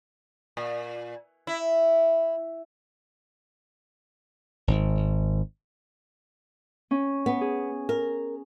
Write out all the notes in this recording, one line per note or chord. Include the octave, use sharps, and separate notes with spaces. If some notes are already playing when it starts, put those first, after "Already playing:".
A#2
E4
G#1
C#4
B3
G#4
A#4